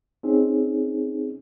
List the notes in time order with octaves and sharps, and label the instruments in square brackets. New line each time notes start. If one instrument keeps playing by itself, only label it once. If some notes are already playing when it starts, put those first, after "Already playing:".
[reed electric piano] C4 C#4 D#4 G#4